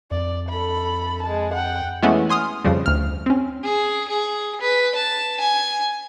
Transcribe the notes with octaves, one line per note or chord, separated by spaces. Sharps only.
F2 D5
A4 B5
G#3 A5
F#5 G5
E3 G#3 A3 B3 C#4 E4
G#5 C6 D#6 F6
F2 C#3 F3 G3
D2 F6
C4 C#4
G#4
G#4
B4
A5
G#5